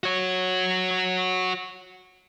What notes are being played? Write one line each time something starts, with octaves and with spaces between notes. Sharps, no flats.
F#4 C#5